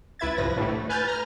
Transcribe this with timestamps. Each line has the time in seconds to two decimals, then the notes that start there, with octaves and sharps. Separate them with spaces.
0.19 C#2 E4 B4 E5 G#6 A6
0.37 C2 G2 F3 B4 A#6
0.57 A2 D3 E3 G3 A3
0.68 A3
0.89 B4 G#5 F6 G6 A6
1.08 A#5 F6